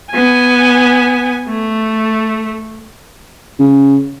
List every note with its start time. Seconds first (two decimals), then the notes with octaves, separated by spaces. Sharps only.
0.12 B3 G#5
1.49 A3
3.59 C#3